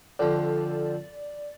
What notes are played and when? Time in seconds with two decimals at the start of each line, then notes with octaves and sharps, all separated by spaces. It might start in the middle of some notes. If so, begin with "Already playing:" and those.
0.19 F2 D3 F3 D5